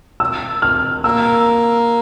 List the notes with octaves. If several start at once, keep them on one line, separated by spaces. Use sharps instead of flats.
E6
F6
A#3 E6